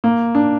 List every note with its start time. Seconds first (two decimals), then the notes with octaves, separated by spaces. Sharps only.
0.04 A#3
0.35 D4